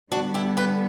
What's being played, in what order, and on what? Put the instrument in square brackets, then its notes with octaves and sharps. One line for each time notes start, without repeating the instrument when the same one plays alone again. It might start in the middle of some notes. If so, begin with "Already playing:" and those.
[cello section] D3 G3 B3 [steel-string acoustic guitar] D4 F#4
[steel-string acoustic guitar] E4 G4
G4 B4